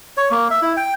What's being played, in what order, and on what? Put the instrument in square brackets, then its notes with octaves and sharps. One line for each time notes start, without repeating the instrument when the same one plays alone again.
[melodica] C#5
A#3
E5
E4
G5